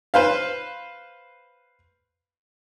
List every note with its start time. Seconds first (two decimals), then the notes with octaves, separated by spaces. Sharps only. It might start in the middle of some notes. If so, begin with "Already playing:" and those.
0.14 B4 C5 F5